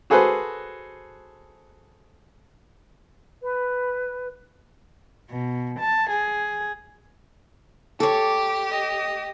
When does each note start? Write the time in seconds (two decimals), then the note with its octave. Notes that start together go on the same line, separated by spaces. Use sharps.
0.10 F#4 G#4 A4 B4 C5
3.41 B4
5.30 B2
5.79 A5
6.11 G#4
8.00 G4 A4 C#5 D6
8.70 D#5